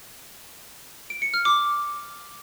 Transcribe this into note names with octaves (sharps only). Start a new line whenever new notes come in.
D7
C#7
F6
D6